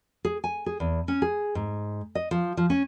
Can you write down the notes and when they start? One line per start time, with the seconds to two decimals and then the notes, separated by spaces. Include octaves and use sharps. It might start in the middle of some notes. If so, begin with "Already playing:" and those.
0.25 G#4
0.44 G#5
0.66 G#4
0.80 E2
1.08 C#4
1.22 G#4
1.55 G#2
2.15 D#5
2.31 F3
2.57 F3
2.70 C#4